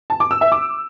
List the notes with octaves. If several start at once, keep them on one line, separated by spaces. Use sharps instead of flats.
A5
D6
E6
E5
D6